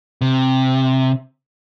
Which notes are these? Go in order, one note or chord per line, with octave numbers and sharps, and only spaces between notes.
C3